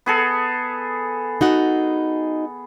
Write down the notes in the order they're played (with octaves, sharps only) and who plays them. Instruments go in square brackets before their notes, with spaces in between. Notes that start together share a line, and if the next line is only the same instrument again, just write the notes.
[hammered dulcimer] B3 G#4 A4
[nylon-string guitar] D#4 F#4 F#5